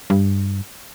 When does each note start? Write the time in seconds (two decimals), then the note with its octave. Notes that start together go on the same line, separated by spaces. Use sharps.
0.10 G2